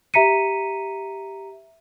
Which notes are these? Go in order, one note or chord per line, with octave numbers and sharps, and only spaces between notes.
G4 E5 A#5 B6 C#7 D#7